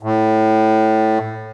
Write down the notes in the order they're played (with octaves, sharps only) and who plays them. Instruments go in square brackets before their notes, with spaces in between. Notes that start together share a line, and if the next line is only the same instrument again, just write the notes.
[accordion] A2